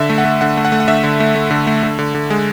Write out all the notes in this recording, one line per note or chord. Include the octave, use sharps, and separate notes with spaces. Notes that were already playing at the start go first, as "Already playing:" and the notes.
Already playing: D3 E5
A3
F#5
A3
D3 F#5
A3
F#5
A3
F#5
D3 E5
D3
A3
A3
D3
A3
D3
D3
D3
G#3